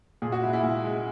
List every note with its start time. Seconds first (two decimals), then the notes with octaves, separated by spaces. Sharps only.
0.22 A#2 G#4
0.32 F#4
0.42 G#3 E4
0.53 E4
0.63 A#2
0.85 G#3